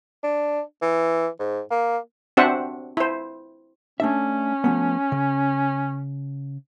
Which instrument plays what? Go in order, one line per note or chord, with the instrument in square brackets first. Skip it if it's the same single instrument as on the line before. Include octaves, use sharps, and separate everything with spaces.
[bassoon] D4
E3
G#2
A#3
[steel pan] C4 D4 F#4 C5 E5 F#5
E4 C5
[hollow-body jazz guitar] A3 D4 E5 [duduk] C#4
[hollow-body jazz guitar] F3 A3 B3
C#3